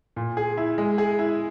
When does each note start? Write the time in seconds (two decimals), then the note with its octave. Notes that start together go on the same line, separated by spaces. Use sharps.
0.16 A#2
0.37 G#4
0.58 E4
0.78 G#3
0.98 G#4
1.19 E4